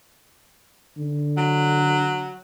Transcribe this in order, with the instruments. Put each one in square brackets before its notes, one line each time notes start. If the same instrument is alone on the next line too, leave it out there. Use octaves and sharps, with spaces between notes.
[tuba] D3
[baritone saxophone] F#3